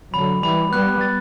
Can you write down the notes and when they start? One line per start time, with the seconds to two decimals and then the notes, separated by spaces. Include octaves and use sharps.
0.13 D3 F#3 B5
0.43 E3 G3 B5
0.72 G3 B3 F#6
1.01 A6